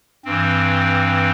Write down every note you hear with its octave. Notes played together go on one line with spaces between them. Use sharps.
G2 E3 C4